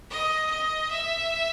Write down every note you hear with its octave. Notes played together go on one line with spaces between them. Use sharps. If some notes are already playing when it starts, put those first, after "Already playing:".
D#5
D#5
E5